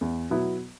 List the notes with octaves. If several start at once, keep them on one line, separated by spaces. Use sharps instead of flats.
E2
B2 F#3 B3 E4